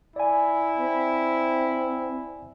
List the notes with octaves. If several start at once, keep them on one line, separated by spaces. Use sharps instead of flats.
E4 D5 G#5
C4